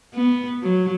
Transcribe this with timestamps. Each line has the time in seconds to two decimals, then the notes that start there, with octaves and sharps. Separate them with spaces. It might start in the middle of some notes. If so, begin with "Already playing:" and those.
0.14 B3
0.63 F#3